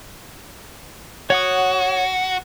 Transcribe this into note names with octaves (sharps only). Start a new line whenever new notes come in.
F#4 C#5 F#5 D#6